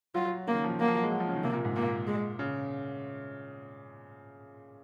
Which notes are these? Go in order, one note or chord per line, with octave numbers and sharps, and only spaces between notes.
F#3 F4
F#3
C#3 A#3
D#3
F3
D#3
F#3 A#3
F3
F#3
G#3
F#3
F3
C#3
D#3
C3 A#3
A#2
G#2
A#2 A#3
G#3
C#3